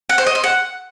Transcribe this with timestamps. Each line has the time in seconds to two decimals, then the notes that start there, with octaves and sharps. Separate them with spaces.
0.09 F#5
0.18 C5
0.27 D#5
0.35 C5
0.44 F#5